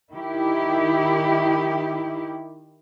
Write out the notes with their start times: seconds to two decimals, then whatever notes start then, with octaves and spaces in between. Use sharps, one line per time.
0.11 D#3 E4 G4